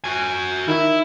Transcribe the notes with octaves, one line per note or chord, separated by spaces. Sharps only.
F#4 G#5
D#3 E4